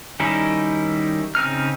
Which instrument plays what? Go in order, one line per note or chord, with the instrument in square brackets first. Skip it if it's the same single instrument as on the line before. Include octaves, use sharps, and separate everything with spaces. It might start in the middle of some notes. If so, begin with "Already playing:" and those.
[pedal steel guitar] D#3 G3 C#4 D#4 E4
C#3 C4 D#4 F6